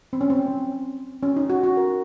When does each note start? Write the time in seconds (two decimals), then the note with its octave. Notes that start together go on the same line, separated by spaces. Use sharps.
0.13 C4
0.21 C#4
0.30 C4
1.23 C#4
1.36 D#4
1.50 F#4
1.63 F#4
1.77 A#4